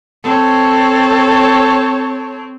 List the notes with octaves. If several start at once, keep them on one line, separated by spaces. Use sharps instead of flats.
C4 A4 C#5